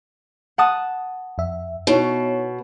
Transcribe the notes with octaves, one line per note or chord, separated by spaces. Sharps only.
F#5 A5 D#6
F2 E5
B2 D#4 E4 C#5